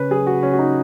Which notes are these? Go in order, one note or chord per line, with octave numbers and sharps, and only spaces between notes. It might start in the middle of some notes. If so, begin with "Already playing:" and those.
Already playing: C#3 C#4 B4 C#5
F#3 G#4
F#4
C#3 C#4
F#4
D#4